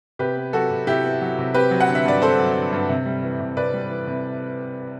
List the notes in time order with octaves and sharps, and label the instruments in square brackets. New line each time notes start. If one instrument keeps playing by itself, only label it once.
[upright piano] C3 G4 B4
B3
F#3 F#4 A4
C3
C3 E4 G4
B3
F#3
C3
C4 G4 B4
F#3
F#5
D3
E5
G2 D5
C4 A4 C5
F#3
D3
G2
C3
G3
E3
C3
C3 B4 D5
G3
E3
C3